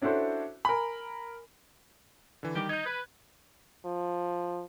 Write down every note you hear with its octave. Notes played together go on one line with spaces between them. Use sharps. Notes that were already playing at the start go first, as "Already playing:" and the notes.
C#4 D4 E4 F#4 A4 C5
A#4 G#5 B5
D3 E3
D#3 G3 G4
D#4 G6 G#6
B4
F3